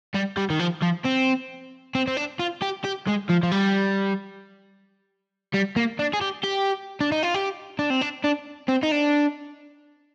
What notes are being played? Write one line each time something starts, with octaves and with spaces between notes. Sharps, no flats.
G3
G3
D#3
F3
F3
C4
C4
C4
D4
F4
G4
G4
G#3
F3
F3
G3
G3
A#3
D4
G#4
G4
G4
D4
D#4
F4
G4
D4
C4
D4
D4
C4
D#4
D4